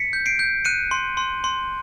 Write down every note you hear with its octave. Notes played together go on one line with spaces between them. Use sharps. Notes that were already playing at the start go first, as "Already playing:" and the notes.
Already playing: B6 C#7
G6
C7 D7
G6
F#6 C#7 D#7
C6
C6
C6